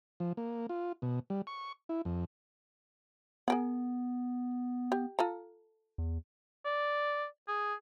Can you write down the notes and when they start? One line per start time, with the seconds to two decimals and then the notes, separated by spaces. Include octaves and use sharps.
0.20 F3
0.37 A#3
0.69 F4
1.02 B2
1.30 G3
1.47 C#6
1.89 E4
2.05 F2
3.48 B3 G#4 A#4 F#5
4.92 G4
5.19 F4 A4 A#5
5.98 E2
6.65 D5
7.48 G#4